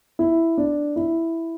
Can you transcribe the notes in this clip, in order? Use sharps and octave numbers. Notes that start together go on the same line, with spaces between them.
E4
D4
E4